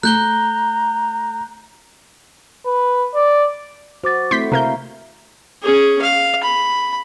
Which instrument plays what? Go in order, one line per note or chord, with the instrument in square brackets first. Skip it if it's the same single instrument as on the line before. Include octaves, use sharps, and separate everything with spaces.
[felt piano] A3 [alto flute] A#5 [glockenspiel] F#6 G6 G7
[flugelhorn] B4
D5
[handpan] F#4 [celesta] C5 D6 A6
[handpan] A3 C4 E4 [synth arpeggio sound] C6 G6 B6
[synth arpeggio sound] C3 A#4 G6 [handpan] A#3 E4 F5 [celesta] E5 A#5
[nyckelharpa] C#4 G#4
F5
B5